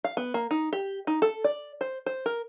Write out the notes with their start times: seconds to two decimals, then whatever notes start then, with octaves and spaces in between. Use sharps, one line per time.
0.04 F5
0.17 B3
0.34 A#3
0.51 D#4
0.73 G4
1.07 D#4
1.22 A4
1.44 D5
1.81 C5
2.06 C5
2.26 A#4